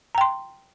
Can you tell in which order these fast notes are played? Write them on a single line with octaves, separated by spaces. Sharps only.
A#5 G5 C6